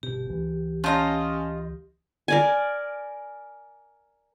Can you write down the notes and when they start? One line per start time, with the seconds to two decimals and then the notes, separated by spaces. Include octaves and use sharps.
0.03 G1 B2 G4
0.29 C#2 E3
0.84 C#4 F4 D#5 A5 A#5 G6
2.28 A#4 D5 G#5